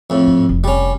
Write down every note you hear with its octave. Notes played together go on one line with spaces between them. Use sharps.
F2 A2
G#2
F1
G3 C#4